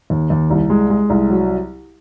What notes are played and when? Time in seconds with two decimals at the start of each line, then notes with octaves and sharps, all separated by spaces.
0.10 D#2
0.30 D#2
0.50 C2
0.70 G#3
0.90 G#3
1.10 C2
1.30 F#3